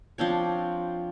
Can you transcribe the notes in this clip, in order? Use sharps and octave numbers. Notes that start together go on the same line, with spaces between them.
F3 C4 D4 C#5